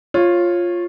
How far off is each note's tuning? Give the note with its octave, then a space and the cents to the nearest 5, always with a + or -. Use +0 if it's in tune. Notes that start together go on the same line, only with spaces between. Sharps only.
F4 +0 C#5 -20